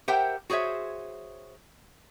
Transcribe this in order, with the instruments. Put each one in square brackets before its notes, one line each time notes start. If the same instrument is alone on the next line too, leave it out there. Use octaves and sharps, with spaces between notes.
[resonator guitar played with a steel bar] G4 A#4 C5 E5 F#5 G5
F#4 G#4 C5 C#5 E5